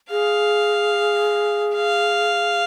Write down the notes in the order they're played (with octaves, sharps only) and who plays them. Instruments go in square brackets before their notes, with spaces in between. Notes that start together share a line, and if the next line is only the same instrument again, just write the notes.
[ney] G#4 [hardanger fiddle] F5
[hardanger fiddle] F5